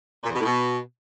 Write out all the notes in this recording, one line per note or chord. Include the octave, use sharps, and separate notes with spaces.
A#2
E2
B2
A2
B2